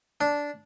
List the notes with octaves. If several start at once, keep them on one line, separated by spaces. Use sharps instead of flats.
D4